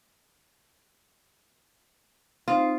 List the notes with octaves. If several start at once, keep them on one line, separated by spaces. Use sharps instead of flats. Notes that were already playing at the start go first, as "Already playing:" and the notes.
C4 D#4 F4 C5